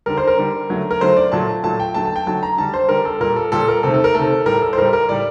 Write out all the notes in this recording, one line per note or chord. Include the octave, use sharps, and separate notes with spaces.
D3 G3 A#4
C5
A#4
D3 G3
D3 F#3 A3
A#4
D3 F#3 A3 C5
D5
A#2 F#3 A3 A5
A#2 F#3 A3 A5
G5
D3 F#3 A3 A5
A5
G5
D3 F#3 A3 A5
A#5
D3 G3 A5
C5
D3 G3 A#4
A4
A#2 G3 A#4
A4
A#2 G3 A4
A#4
C3 D#3 A3 A4
A4
A#4
C3 D#3 A3 A4
A2 G3 A#4
A4
C5
A2 G3 A#4
A#4
A2 G3 D5